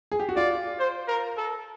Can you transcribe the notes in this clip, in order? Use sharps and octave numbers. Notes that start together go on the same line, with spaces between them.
G#4
G4
F#4
F4 D5
C5
A#4
A4